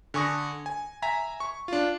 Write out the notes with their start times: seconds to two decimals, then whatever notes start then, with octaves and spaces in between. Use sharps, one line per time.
0.14 D3 G#5 C#6 D#6 A#6
0.66 G#5
1.02 E5 G#5 A#5 B6
1.40 C#6
1.68 D4 F4